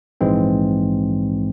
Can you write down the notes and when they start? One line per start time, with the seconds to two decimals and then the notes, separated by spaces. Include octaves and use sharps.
0.21 A#1 G#2 E3 G#3 C4